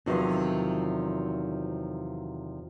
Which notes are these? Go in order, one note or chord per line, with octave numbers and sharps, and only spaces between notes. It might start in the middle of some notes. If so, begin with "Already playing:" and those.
E2 C3 D#3 F3 F#3